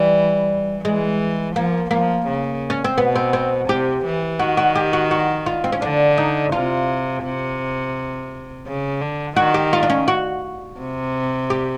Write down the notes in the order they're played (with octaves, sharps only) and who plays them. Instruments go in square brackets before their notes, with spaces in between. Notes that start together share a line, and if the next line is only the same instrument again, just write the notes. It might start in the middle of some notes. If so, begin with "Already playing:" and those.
Already playing: [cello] E3 [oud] G3
[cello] E3 [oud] G#3
[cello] F3 [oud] A#3
[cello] F3 [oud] A#3
[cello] C#3
[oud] C#4
C4
[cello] B2 [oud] B3
[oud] C4
C4
[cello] C3 [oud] G4
[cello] E3
[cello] D#3 [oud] F#4
[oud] F#4
G4
F#4
F#4
F4
C4
C#4
[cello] D3 [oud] D4
[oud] D#4
[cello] C3 [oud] F4
[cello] C3
C#3
D3
[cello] D#3 [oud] F#4
[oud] G4
F4
D4
C#4
F#4
[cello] C3
[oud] G4